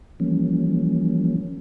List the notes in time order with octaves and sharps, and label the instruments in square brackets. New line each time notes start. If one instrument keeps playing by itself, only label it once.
[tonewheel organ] E3 F3 G3 A#3 C#4